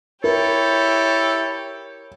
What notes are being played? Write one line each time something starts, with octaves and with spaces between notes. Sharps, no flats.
E4 G4 A4 A#4 C#5